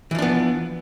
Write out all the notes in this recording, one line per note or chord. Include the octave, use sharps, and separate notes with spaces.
E3 F3 B3 D4